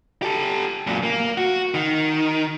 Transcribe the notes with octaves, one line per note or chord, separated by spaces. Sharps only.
G4 A4
F#2 A#2
A#3
F#4
D#3